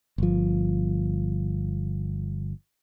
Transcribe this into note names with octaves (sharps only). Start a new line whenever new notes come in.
G1 F3